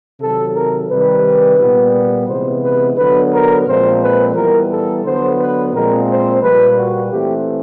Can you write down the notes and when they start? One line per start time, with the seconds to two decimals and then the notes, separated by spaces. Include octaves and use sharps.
0.21 C3 D#3 F#3 A4
0.55 A#4
0.90 C3 D#3 G3 B4
1.59 A#2 G3 B3
2.28 C3 E3 G#3 B3 C5
2.63 B4
2.97 D3 F#3 B3 B4
3.32 A#4
3.66 A#2 F3 G#3 C4 C5
4.01 B4
4.35 E3 G3 B3 A#4
4.70 A4
5.04 D3 F#3 B3 C5
5.39 B4
5.73 A#2 F3 G#3 C4 A#4
6.08 C5
6.42 A#2 G3 A#3 B4
6.77 F#4
7.11 E3 A3 C4 G4